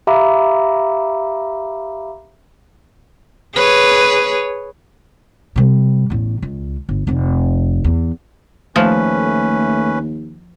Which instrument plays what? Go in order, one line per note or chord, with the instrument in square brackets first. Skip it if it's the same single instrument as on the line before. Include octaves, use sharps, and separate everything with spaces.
[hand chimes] G4 E5 F5 A#5 B5 D6
[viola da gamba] G#4 B4 C#5
[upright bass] C3 G3
A1 E2
C#2
G1
F1 F2
E2
[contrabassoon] D#2 [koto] F3 [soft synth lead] A3 [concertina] C#4 B4